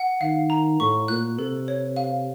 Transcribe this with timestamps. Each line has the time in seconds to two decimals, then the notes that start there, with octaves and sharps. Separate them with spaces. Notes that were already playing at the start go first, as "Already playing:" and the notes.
Already playing: F#5
0.21 D#3 F5
0.50 A#5
0.80 A2 C#6
1.08 A#2 F#6
1.38 C3 A4
1.68 C#5
1.96 F5